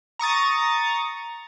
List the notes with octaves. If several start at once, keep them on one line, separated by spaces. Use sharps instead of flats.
A#5 C#6 D#6 A6